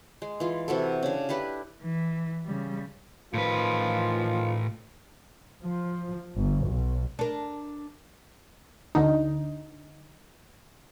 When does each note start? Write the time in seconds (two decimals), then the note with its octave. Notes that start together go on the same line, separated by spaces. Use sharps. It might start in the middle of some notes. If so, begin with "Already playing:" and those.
0.22 G#3
0.40 E3 F4
0.68 C3 E3 F#4 A4
1.03 C#3 D4
1.29 D4 E4 G4 B4
1.83 E3
2.46 C#3 G3
3.34 A2 D#3 F3 F4 B4
5.62 F3
6.38 G1
6.68 B1
7.19 D4 A#4
8.95 D2 D3 D#4